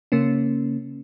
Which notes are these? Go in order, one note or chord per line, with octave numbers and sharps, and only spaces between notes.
C#3 A#3 C#4